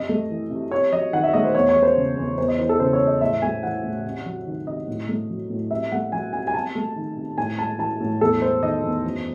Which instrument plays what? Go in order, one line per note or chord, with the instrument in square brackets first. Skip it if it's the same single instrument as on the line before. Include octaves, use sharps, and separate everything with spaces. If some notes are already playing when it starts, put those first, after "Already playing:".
Already playing: [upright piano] F#2 C3 D#5
A3
E3
C3
C3 C#5
F#3 D#5
D#3 F#5
E5
A3 D#5
C5
E2 C#5
C#5
G#3
C5
C#3
E2
E2 C5
D#5
E3 C5
A4
C#3 C5
C#5
G#3
D#5
A2 E5
A3 G#5
E3 F#5
A2
C3
F#3
D#3
C3 D#5
A2
A3
F#3
A2
C3 E5
A3 F#5
F#3 G#5
C3 G#5
G#5
C3 A5
A3
D#3
C3
A2 G#5
G#3 A5
E3 A5
A2
E2 A4
G#3 C5
D#3 D#5
E2
F#2